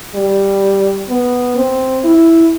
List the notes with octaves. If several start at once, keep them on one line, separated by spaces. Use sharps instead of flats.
G3
B3
C4
E4